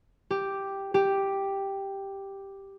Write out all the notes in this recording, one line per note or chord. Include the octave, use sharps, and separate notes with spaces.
G4
G4